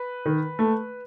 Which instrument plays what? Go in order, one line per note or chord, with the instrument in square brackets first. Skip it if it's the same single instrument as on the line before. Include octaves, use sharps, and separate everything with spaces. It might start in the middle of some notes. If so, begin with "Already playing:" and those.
Already playing: [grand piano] B4
D#3
A3